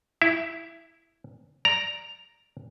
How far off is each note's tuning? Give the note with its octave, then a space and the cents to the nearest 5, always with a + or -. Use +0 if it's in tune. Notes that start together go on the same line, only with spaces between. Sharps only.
E4 +0 E5 +20
D5 +0 A#5 +0